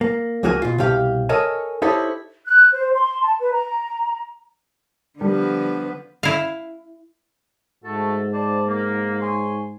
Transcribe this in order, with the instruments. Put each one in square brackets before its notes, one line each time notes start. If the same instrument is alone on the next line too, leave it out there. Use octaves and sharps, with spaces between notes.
[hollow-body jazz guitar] A#3
C#2 F3 A#3 F#4 A#4 G#5
B2 F4
C2 B2 G4 F5
A4 A#4 C#5 D#5 G#5
D#4 E4 G4 A4 C5 C#5
[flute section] F#6
C5
C6
A5
B4
A#5
[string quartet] D3 F3 B3 [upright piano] G3
[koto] E4 F5
[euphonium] G#2 [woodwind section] A3 F#4 A4
[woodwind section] C5 D5 A5
A#3
C#5 G#5 C6